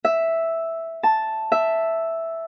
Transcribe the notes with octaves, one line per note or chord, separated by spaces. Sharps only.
E5
A5
E5